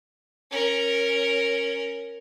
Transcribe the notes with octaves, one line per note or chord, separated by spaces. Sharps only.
C#4 A#4